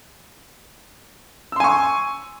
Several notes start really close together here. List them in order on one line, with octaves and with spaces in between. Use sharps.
E6 C6 G#5 C#6